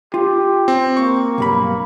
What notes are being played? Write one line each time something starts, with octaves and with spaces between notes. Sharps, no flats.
F4 G4
C4
A#3 C#6
B1 G2 B5